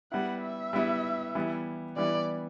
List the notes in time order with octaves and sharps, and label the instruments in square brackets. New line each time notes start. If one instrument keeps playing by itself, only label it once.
[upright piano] G3 B3 E4 [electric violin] F#5
[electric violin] E5
[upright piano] G3 B3 E4
E3 G3 B3 E4
[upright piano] E3 G3 B3 E4 [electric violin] D5